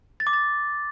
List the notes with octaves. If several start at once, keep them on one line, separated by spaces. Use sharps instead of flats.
A6
D6
A6